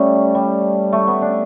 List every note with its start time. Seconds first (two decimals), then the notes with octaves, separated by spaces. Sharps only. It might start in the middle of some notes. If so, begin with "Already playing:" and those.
Already playing: G3 A3 C#4
0.35 G3
0.93 A3
1.07 B3
1.22 D4